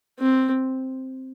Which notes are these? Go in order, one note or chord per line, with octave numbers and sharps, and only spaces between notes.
C4